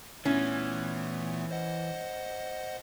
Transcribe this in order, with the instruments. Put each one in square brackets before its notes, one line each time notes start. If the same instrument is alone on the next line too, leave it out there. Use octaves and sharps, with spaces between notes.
[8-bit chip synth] A#2 A3 B3 [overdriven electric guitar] E3 [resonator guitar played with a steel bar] C#4
[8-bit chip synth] C5 D#5 F#5